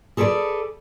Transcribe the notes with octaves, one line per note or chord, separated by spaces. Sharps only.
G#4 A4 B4 C5 D5